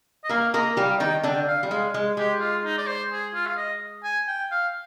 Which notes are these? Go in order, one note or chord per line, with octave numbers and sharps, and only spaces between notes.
D#5
A#3 A#4 F5
A#3 A#4 D#5
G3 G4 F5
D#3 D#4 G5
D3 D4 G5
F5
G3
G#3 F5
G#3
G#3 G4
F4
D#4
D5
C5
G#4
F4
F5
D#5
G#5
G5
F5